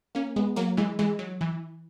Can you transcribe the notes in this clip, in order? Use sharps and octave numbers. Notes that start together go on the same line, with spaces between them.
A#3 C#4
G#3 B3
F#3 A#3
E3 G#3
E3 G#3
F#3
E3